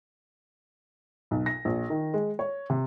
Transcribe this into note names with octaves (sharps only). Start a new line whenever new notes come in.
B1
A#6
A#1
D#3
G#3
C#5
C3